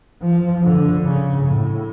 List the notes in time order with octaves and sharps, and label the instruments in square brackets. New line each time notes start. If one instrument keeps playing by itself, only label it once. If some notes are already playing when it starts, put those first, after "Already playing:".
[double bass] F3
D3
C#3
A2